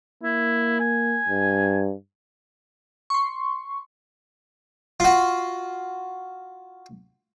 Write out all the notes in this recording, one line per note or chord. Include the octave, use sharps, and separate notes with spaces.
A#3 E4
G#5
G2
C6 C#6
F4 F#4